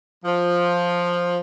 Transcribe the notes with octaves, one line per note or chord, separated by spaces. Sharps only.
F3